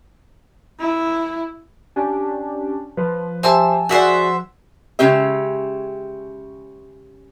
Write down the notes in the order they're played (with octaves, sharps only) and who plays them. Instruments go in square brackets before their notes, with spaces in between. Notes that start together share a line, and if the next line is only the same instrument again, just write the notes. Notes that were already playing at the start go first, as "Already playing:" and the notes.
[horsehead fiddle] E4
[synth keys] C#4 D4 G4 [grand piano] G#5
[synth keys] F3 [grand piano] B4
[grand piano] G4 C5 E5 [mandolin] G#5 A5 E6
[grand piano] F#4 G#4 D5 [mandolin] C5 E5 F#5
[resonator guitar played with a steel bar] C#3 G#3 C#4 G4 E5